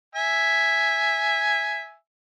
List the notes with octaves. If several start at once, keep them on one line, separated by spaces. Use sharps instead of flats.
E5 G#5